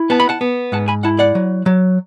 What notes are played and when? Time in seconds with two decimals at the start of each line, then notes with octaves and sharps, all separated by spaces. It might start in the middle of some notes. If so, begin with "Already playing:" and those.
Already playing: E4
0.10 B3 A5
0.20 B5
0.29 F#5 A5
0.41 B3
0.72 G#2 F#5 A5
0.88 G#5 B5
1.03 E4 F#5 A5
1.19 D5 F#5
1.35 F#3
1.66 F#3